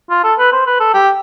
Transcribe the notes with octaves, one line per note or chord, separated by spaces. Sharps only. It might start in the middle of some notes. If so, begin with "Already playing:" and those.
F4
A4
B4
C5
B4
A4
G4